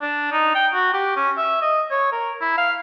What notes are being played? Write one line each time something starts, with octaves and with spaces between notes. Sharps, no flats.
D4
D#4
G5
F#4
G4
C#4
E5
D#5
C#5
A#4
E4
F5